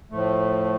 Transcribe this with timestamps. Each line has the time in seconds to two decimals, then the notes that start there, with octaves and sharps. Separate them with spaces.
0.11 A2 F3 A3